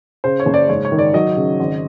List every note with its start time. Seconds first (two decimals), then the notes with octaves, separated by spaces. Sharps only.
0.24 C#3 C5
0.40 C#5
0.46 F#1
0.54 D5
0.69 G#2 C#5
0.85 C#5
0.92 D#3
0.99 D5
1.14 F#3 D#5
1.36 C#3
1.60 G#1